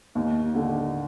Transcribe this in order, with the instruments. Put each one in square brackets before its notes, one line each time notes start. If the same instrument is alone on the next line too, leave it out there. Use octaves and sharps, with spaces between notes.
[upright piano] D#2
D3